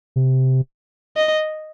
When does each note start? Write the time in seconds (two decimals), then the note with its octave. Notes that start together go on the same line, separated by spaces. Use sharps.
0.16 C3
1.17 D#5